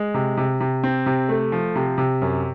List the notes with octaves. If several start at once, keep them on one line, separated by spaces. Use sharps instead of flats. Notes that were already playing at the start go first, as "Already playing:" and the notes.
Already playing: G#3
C3
C3
C3
C4
C3
A3
F3
C3
C3
F#2